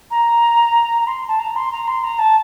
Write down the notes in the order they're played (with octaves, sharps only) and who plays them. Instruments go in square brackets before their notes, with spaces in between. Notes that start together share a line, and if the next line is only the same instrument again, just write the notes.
[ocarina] A#5
A#5
C6
A5
A#5
C6
A#5
C6
A#5
A5